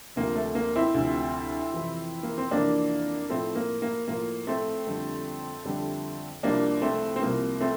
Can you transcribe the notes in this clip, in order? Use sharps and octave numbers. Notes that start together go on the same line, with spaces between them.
D2 C3 F3 A#3
A3
A#3
C4 E4
D2 C3 F3
F2 C3 E3
A#3
C4
F2 C3 E3 A#3 D4
A2 F3 A3 C4
A#3
A#3
A2 F3 A#3
A3 C4
F2 D3 G3
F2 D3 G3
C2 C3 F3 A#3 D4
A3 C4
C4
C2 C3 F3 A#3
A3 C4